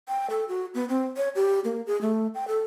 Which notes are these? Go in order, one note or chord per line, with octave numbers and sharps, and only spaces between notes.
G5
A4
F#4
B3
C4
C#5
G4
A#3
G#4
A3
G5
A4